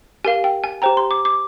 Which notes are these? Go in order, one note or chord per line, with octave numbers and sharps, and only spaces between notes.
G4 A#4 F5 G#5
G5
G#5
G4 C5 G5 A#5
C6
D6
D6